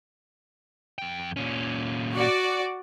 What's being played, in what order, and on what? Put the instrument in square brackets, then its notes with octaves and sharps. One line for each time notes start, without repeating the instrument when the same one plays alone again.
[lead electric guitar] F2 G5
A#2 C#4
[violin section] F#4 D5